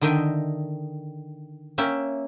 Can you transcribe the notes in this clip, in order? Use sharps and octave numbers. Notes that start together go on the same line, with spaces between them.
D3 D#3 D#5 E5 G5
A#3 C#4 E5 G5